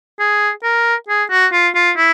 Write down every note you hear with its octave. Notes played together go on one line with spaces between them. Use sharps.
G#4
A#4
G#4
F#4
F4
F4
E4